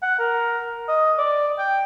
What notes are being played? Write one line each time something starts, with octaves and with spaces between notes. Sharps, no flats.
F#5
A#4
D#5
D5
G5